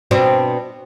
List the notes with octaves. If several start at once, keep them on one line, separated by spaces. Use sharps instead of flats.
B2 C4 D4